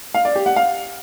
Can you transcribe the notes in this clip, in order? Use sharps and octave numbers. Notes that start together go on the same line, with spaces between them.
F5
D5
G4
F#5
F5